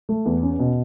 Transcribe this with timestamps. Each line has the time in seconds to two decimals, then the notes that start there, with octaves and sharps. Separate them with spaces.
0.09 A3
0.26 E2
0.43 C#4
0.59 B2